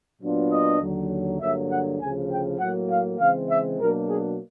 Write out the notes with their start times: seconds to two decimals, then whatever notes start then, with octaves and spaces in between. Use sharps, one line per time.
0.21 A#2 F#3 B3 D4 F4
0.52 D#5
0.81 D#2 D3 F#3
1.40 G2 D3 F#3 A#3 E5
1.71 F#5
2.00 D2 C#3 F3 G#5
2.31 G5
2.60 A2 F#3 A#3 F#5
2.90 F5
3.19 C#3 E3 G#3 C4 F5
3.50 E5
3.79 B2 F#3 A#3 D4 A#4
4.09 G#4